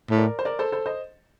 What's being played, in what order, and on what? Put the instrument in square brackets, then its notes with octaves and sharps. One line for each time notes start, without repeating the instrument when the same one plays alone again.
[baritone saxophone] A2
[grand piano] A#4 D5
C5
A#4 D5
A4 C5
A4 C5
C5 D#5